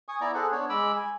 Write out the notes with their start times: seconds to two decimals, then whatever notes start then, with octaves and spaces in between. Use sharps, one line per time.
0.08 G#5 C#6 D#6
0.21 B3 E4 D5 A#5
0.34 G#4 A4 C5 F#5
0.52 B3 D4 C#5
0.69 G#3 B5 D6 E6
0.96 G#5